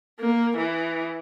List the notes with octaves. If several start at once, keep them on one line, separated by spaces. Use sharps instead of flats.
A#3
E3